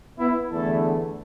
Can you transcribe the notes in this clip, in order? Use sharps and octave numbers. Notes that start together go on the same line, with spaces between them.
B3 E4
E2 D3 A3 E4 A4